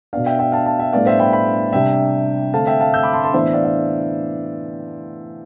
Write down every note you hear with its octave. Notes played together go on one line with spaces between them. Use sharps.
B2 B3 D4 D5 F5
E5 G5
E5 G5
F5 A5
F5 A5
E5 G5
A2 G3 B3 D4 D5 F5
C5 E5
G5 B5
G5 B5
C3 G3 D4 E5 G5
D3 A3 C4 F5 A5
E5 G5
F5 A5
E6 G6
B5 D6
A5 C6
A5 C6
A2 E3 B3 D4 C5 E5
D5 F5
E5